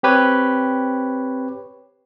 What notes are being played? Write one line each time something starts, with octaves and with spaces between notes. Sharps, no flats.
C4 G4 B4 C#5